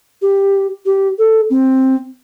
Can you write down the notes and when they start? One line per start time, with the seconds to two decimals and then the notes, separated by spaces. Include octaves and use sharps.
0.22 G4
0.86 G4
1.18 A4
1.50 C4